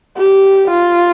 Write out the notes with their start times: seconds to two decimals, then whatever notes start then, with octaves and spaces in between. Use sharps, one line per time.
0.17 G4
0.70 F4